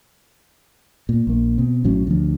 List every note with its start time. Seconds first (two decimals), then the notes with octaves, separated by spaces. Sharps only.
1.09 A#2
1.27 A#1 A#3
1.58 B2 C4
1.84 A#1 A2 F#3 C#4
2.07 D2 F3